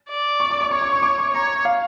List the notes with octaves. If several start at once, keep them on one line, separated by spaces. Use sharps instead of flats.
D5
C#6
D6
D6
C#5 C#6
D6
C#6
D6
C#6
C#5 A#5
F5